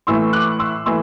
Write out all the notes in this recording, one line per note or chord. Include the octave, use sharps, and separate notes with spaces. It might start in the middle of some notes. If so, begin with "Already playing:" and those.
A2 E3 A3 C6 E6
D6 F#6
C6 E6
E3 A3 C6 E6